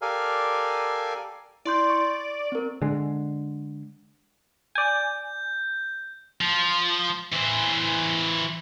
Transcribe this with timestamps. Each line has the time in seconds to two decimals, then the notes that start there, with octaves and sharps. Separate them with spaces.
0.02 G4 A4 A#4 D5 F5 G#5
1.65 E4 D5 C6 G6
1.90 C#6
2.52 C4 A#4
2.82 D3 G#3
4.75 D5 G#5 G6
6.41 F3
7.32 E3 C5